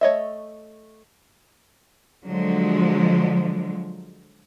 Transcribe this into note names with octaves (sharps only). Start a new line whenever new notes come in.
A3 C#5 D#5 E5
D3 F3 F#3 G#3